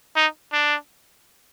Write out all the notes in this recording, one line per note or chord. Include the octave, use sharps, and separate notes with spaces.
D#4
D4